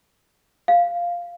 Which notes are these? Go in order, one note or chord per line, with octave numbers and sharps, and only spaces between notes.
F5